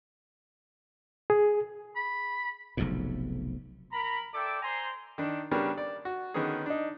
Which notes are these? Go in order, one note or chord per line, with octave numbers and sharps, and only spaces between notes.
G#4
B5
F1 B1 F2 G#2
A#4 A#5 B5
E4 A4 D5 G5 D6
C5 G#5 A#5 C6
D#3 D4
C#3 G3 B3 C#4 D4 A#4
D5
F#4
D3 D#3 B3 C#4 G#4
D4 D#4